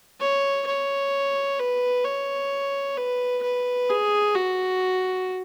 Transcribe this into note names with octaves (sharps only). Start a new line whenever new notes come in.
C#5
C#5
B4
C#5
B4
B4
G#4
F#4